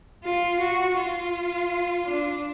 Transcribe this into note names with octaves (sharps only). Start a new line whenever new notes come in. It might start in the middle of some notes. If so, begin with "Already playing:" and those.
F4
F#4
F4
D4